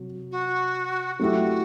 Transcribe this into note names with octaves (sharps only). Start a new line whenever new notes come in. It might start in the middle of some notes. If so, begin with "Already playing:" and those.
Already playing: C3 F#3
F#4
F#3 A3 E4 F#4 G4